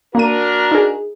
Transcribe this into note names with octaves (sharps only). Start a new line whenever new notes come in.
A#3 D4 F#4 A#4 D#7
D#4 G#4